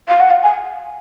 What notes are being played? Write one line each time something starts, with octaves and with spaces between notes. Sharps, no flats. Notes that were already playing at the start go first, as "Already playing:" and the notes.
F5
F#5
F5
G#5